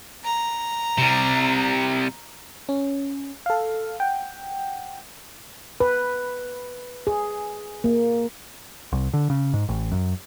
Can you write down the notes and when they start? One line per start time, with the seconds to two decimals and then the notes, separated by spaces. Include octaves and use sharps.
0.24 A#5
0.98 C3 G3
2.69 C#4
3.46 A4 F5
4.00 F#5 G5
5.80 B4
7.07 G#4
7.84 A#3
8.92 C2
9.13 D3
9.30 C#3
9.53 G#2
9.69 A1
9.92 F#2